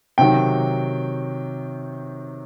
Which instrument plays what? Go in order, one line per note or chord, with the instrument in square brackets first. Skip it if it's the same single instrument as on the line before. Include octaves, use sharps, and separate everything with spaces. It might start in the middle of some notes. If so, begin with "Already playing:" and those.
[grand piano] C3 D#3 F#3 G5